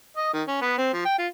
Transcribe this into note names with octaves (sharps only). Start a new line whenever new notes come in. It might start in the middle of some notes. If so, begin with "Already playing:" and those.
D#5
D#3
C#4
B3
C4
F3
G5
F4